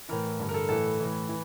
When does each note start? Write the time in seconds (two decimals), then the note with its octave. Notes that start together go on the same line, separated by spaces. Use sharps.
0.09 A2 E3 A#4
0.39 G2 D3
0.49 A#4
0.54 A4
0.69 A2 E3 A4
0.99 A2 E3
1.29 E3